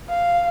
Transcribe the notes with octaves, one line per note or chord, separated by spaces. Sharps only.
F5